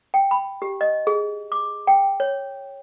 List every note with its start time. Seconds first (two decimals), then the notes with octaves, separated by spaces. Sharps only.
0.14 G5
0.31 B5
0.62 G4
0.81 D#5
1.07 G#4
1.52 D6
1.87 G5
2.20 C#5